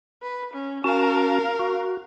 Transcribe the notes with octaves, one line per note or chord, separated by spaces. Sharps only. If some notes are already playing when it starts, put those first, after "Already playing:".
B4
C#4
C#4 F#4 A#4 F5 A5
F#4